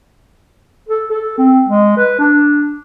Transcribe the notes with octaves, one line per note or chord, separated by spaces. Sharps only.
A4
A4
C4
G#3
B4
D4